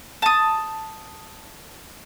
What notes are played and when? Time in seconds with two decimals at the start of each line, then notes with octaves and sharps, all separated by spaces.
0.22 A5 D#6